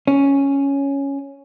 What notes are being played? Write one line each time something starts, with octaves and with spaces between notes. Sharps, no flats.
C#4